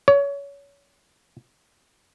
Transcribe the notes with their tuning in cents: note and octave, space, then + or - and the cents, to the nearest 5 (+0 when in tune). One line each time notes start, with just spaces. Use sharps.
C#5 +25